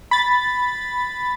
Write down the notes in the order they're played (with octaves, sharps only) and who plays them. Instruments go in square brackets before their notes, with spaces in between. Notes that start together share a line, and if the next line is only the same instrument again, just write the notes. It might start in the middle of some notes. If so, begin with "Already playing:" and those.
[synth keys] B5 A6